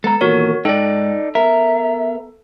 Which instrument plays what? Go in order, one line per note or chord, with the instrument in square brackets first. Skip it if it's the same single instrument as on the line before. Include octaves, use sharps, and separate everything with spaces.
[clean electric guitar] G#3 B3 A#5 [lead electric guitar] A4
[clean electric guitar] E2 A#2 D#3 [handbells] F#4 A#4 C#5
[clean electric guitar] G#2 G5 [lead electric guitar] D#4 D5 [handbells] A4
[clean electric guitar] B3 A#4 [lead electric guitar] E5